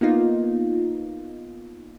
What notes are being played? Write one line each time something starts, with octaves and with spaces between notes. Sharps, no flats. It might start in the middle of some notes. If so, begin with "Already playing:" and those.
A#3 B3 D#4 F4